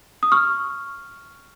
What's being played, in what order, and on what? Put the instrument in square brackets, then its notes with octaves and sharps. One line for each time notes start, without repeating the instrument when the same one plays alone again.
[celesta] D#6
C#6 F6